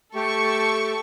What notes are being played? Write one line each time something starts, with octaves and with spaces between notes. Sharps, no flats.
A3 G4 A4 C#6